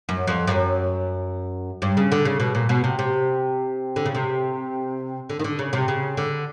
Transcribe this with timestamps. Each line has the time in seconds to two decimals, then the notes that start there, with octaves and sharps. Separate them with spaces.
0.09 F#2
0.27 F2
0.47 F#2
1.82 G2
1.97 C#3
2.12 D3
2.25 C#3
2.40 B2
2.55 A#2
2.69 B2
2.84 C3
2.99 C3
3.96 D3
4.06 C#3
4.15 C3
5.30 D3
5.39 D#3
5.44 D3
5.59 C#3
5.73 C3
5.88 C#3
6.17 D3